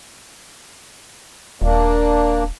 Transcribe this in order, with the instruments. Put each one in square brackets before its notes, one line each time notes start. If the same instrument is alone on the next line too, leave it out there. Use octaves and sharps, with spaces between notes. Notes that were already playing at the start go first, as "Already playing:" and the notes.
[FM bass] D#1 [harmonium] A#3 D4